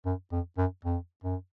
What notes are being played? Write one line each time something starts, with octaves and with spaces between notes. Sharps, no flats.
F#2
F2
F#2
F2
F#2